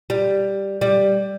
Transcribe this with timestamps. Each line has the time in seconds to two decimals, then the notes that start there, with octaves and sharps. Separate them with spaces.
0.10 G3
0.81 G3